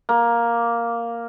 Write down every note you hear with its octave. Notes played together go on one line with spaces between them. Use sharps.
A#3